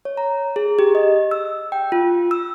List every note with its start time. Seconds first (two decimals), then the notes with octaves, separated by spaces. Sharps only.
0.05 C#5
0.17 A#5
0.56 G#4
0.79 G4
0.95 D#5
1.31 E6
1.72 G5
1.92 F4
2.31 E6